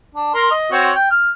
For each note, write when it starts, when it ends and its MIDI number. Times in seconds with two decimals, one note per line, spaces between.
0.14 0.33 62
0.34 0.50 70
0.34 0.50 84
0.51 0.70 75
0.72 0.91 60
0.72 0.91 66
0.72 0.91 73
0.95 1.07 79
1.11 1.32 89